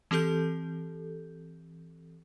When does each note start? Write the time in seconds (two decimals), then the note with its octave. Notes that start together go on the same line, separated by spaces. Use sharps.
0.11 E3 C4 G4 A4 G6